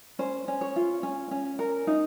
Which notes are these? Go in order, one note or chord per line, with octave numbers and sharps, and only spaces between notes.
C#4 C5
C#4
C#5
F4
C#4
C#4
A#4
D#4